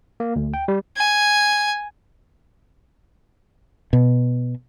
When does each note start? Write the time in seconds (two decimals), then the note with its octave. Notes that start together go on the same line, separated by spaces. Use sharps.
0.20 A#3
0.36 D2
0.54 G5
0.68 G3
0.97 G#5
3.93 B2